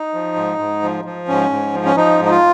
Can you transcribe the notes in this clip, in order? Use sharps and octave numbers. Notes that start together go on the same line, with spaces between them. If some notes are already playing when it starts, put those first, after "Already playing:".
Already playing: D#4
F3
G#2
G#2
F3
F3
G#2 C#4
G#2
F3
C#4
F3 D#4
G#2
D#4
F4